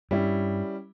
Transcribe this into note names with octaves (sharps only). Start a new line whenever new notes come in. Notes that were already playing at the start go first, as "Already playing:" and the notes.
G2 G3 C#4 E4